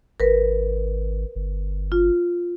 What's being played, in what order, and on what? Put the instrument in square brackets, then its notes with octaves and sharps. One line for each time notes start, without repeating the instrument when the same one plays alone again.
[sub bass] G#1 [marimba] A#4 B4
[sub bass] G1
[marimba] F4